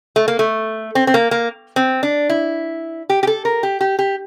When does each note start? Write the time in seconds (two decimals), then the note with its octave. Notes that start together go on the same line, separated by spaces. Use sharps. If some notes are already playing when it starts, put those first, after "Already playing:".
0.16 A3
0.28 A#3
0.39 A3
0.95 C4
1.07 C4
1.14 A#3
1.31 A#3
1.76 C4
2.03 D4
2.30 E4
3.09 G4
3.23 G4
3.27 A4
3.45 A#4
3.63 G4
3.81 G4
3.99 G4